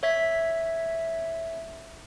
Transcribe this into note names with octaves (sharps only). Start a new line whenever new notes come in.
C#5 E5 G#6 B6